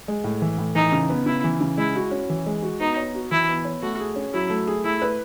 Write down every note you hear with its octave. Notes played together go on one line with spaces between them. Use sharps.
G#3
A2
E3
A2
E3 D#4
C#3
B3
C#3 E4
E3
C#3
G#3 E4
F#4
C#4
E3
G#3
F#4
B3 D#4
C#5
F#4
E3 E4
B3
C#5
A3 F#4
G#4
C#4
F#3 E4
A3
G#4
A3 E4
B4